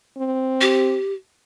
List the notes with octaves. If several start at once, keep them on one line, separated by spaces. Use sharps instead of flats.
C4
G4